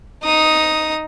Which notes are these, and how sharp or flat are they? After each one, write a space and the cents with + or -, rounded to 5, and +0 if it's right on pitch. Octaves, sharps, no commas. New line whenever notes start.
D#4 +0 D#6 +5